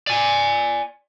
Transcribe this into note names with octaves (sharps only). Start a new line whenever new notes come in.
D5 G#5